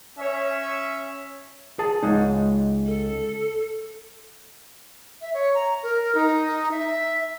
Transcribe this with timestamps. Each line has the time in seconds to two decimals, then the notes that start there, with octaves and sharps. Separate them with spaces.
0.18 C#4 C#5 E5
1.79 G#4 A5
2.03 C#2 G#3 D#4
2.86 A4
5.21 E5
5.34 C#5
5.54 A#5
5.83 A#4
6.15 D#4
6.71 E5